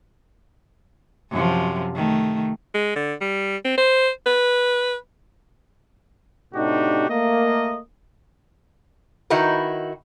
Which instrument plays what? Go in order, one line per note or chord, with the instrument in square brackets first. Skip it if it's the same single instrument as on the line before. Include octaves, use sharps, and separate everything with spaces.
[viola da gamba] F#2 C3 F3
D#3 A3
[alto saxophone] G#3
D3
G3
C4
C5
B4
[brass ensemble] A2 C3 D4 D#4 F#4 G4
A3 A#3 D#5
[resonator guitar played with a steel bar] D#3 D#4 E4 F#4 B4